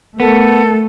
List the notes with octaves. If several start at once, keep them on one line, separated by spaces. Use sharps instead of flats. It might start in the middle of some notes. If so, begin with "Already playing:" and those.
A3 B3 A4 A#4